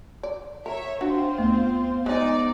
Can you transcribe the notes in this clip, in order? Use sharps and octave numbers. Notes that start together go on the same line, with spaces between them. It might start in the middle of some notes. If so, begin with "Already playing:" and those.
D5
A#4 C#5 E5
C4 D4 F4 F#4 C5
D2 A3 B3
G#3 D#4 C5 D5 D#5 G#5